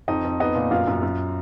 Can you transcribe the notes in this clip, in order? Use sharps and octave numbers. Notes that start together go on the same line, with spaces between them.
F2 D#4 D#5
F2
B3 D#4 D#5
A#2
F#2 F4 F5
F#2
F#2